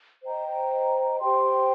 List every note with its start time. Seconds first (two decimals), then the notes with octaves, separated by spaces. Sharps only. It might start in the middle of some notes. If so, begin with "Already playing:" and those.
0.23 C5 D#5 G5 A#5
1.19 G4 C5 G5 C6